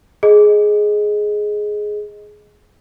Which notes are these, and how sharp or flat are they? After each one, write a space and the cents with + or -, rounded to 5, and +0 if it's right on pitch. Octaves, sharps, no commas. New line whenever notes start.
G#4 +10 D#5 +0